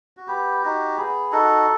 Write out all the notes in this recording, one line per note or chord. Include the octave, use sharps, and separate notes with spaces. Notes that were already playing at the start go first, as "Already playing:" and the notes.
F#4
B3 G4
D#4 F#4
B3 G#4
D#4 F#4 A4